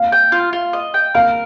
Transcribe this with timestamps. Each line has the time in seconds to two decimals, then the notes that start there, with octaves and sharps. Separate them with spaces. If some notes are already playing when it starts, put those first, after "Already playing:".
Already playing: F5
0.12 G5
0.32 F4
0.53 F4
0.73 D#5
0.94 G5
1.15 A#4 F5